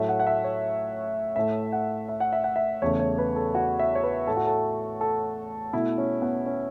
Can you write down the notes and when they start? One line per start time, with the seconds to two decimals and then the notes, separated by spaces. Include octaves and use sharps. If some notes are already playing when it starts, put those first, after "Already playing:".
Already playing: A2 F#3 A3 E5
0.09 F#5
0.19 F#5
0.27 E5
0.44 C#5
1.36 A2 A3 E5
1.72 F#5
2.09 E5
2.20 F#5
2.33 E5
2.44 F#5
2.56 E5
2.82 E2 C#3 A3 C#5
3.00 C#5
3.18 B4
3.36 A4
3.55 F#4
3.79 E5
3.95 C#5
4.03 B4
4.27 A2 A3 A4
4.37 F#4
4.47 A4
5.01 A4
5.73 B2 A3 E4
5.98 C#4
6.22 B3
6.46 C#4